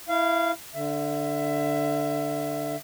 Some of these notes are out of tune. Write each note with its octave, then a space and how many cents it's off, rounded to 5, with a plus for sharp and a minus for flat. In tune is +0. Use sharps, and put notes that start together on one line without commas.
E4 +0 F5 -20
D3 +0 E5 +20